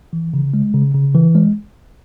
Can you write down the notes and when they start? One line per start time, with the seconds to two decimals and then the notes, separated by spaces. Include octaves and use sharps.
0.13 E3
0.34 C#3
0.54 G#3
0.74 C#3
0.94 C#3
1.15 E3
1.35 G#3